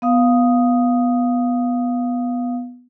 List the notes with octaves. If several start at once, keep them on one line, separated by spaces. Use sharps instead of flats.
B3 F5 D#6